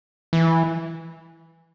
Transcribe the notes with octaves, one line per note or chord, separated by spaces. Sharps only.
E3